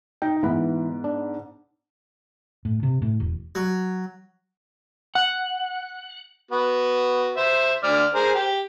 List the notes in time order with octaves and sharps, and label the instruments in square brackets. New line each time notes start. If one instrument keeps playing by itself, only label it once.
[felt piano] D#4 [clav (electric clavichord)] G5
[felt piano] G#2 B3 [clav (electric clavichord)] E3 B4
[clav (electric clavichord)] D4
[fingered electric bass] A2
C3
A2
E1
[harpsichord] F#3
[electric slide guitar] F#5
[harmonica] B3 F#4
C5 E5
D3 D5 F6
G#4 A#4 C5
G4